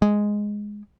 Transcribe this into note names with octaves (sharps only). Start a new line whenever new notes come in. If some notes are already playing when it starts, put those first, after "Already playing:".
G#3